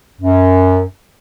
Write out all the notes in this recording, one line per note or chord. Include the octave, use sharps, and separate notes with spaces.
F#2